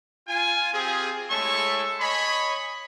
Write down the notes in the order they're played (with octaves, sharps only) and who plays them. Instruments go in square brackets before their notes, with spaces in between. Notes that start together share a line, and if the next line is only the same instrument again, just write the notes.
[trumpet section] F4 G#5
C4 F4 G4 G#4
G#3 A3 E4 A4 C#5 C#6
C#5 D#5 G#5 B5